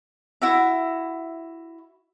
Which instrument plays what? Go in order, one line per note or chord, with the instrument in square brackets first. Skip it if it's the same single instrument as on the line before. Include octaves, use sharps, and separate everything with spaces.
[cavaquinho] E4 F#4 E5